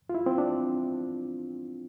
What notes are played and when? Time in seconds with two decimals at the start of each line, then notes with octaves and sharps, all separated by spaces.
0.09 F4
0.15 E4
0.26 C4
0.38 D4